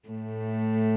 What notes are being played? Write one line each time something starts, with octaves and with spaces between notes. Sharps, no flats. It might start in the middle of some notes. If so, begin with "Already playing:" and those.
A2 A3